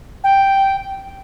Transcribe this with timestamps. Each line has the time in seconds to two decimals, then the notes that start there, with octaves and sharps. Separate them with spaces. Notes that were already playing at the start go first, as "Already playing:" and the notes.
0.23 G5